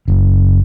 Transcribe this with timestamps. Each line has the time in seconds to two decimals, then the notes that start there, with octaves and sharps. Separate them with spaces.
0.08 F#1